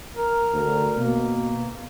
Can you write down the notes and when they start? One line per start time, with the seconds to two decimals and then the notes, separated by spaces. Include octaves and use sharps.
0.16 A#4
0.53 D2
0.97 B2 A#3